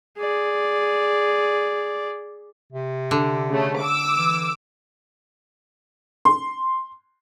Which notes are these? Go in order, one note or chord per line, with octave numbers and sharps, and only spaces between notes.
G#4 D5
C3
D3
C#3 A3
D6 E6
E3
C6